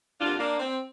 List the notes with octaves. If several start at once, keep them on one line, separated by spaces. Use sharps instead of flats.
F2 D3 G3 A#3 D4 F4
A#3 D4
C4